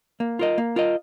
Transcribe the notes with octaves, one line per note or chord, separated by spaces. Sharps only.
A#3
F4 A#4 D#5
A#3
F4 A#4 D#5